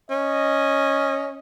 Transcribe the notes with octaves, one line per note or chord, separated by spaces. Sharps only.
C#4 D#5